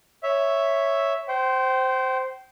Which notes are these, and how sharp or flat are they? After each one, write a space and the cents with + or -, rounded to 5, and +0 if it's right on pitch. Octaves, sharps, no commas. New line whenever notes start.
C#5 +0 E5 +0
C5 -5 G5 -35